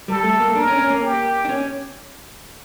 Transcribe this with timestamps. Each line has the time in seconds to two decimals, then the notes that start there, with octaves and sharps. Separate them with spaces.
0.08 G3 A4
0.24 A3
0.40 A#3
0.55 D4 A#4
0.67 C#4
0.79 C#4
0.90 A#3
1.02 G4
1.45 D4
1.49 C#4